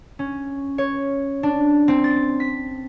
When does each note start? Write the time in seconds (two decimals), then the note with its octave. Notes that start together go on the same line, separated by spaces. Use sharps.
0.19 C#4
0.78 C#5
1.43 D4
1.88 C4
2.04 A6
2.40 B6